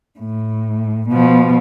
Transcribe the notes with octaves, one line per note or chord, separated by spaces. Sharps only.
A2
B2 F3